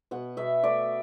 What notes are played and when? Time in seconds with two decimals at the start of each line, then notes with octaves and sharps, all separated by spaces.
0.11 B2 F#5
0.37 B2 E5
0.64 A3 D5